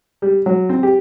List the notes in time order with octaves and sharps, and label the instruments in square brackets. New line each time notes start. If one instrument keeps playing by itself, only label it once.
[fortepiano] G3
F#3
C4
G4